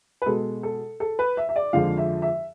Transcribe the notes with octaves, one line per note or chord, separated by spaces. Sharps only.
B4
B2 G#3 A4
A4
A4
B4
E5
E5
D5
F2 D3 F3 G#3 F5
E5
E5